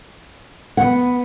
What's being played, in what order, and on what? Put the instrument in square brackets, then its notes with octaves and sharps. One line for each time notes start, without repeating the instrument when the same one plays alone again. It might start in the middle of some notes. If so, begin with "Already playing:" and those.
[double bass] B3 [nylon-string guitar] F#5